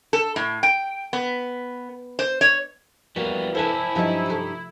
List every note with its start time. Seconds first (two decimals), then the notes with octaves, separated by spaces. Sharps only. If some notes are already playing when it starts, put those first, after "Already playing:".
0.13 A4
0.36 A2
0.63 G5
1.13 B3
2.19 C5
2.41 C#5
3.16 E3 G3 A#3 B3 F#4
3.55 E4 A4 B4 C5 G#5 A5
3.95 G2 F3 F#3 D#4 A#5
4.26 C3 A3